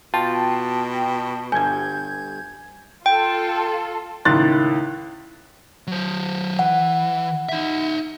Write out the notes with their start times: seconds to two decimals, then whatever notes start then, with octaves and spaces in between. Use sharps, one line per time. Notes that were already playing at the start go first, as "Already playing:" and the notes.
0.14 B2 F4 G5 A5
1.52 G1 G2 G#5 G6 G#6
3.06 F4 A4 G5
4.25 C#2 A2 D#3 C6 F#6 A6
5.87 F#3 C5
6.59 E3 F#5
7.49 D#4 E5